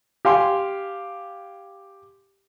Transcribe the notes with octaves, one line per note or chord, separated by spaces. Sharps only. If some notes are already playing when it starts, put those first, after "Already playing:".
G4 F5 G#5 C6